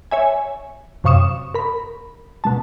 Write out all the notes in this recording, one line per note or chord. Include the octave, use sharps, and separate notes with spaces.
C#5 E5 G#5
F#2 C3 F5 C#6 D#6 E7
A#4 B5
B2 G#3 A5